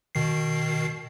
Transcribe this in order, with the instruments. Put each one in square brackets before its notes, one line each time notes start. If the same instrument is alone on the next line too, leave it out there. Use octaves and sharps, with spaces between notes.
[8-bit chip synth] B2 D#3 C7